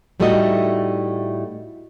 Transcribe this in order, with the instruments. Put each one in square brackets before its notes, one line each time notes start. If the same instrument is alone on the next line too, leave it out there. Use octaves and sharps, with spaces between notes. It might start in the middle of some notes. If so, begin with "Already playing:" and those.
[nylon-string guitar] A2 G3 A3 D#4 F#4 D#5